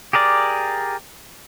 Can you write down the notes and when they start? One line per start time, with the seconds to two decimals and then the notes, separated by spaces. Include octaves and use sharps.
0.13 G4 G#4 A#4 D5